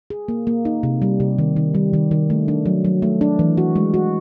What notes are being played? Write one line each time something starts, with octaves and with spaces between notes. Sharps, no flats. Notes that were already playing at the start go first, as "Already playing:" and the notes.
G#4
A#3
A#3
D#4
C3
G3
C3
D#3
D#3
G3
D#3
D#3
A3
D4
F#3
F#3
A3
D4
E3
F#4
G#3
F#4